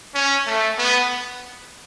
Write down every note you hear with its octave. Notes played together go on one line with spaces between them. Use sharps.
C#4
A3
B3